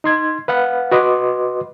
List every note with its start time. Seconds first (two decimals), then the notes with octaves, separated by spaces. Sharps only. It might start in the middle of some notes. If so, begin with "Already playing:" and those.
0.04 D#4 C6 G#6
0.48 B4 F5 F#5 B5
0.92 F#4 B4 D#5 C6 D6